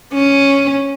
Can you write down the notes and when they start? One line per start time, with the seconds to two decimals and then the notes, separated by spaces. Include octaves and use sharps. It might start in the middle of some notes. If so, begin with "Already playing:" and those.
0.13 C#4